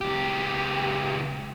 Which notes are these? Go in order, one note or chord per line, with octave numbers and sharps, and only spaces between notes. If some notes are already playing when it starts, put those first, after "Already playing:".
C#2 G4